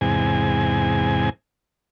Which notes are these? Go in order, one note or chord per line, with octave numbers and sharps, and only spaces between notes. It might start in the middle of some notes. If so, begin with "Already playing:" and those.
E2 G#2 C3 G#5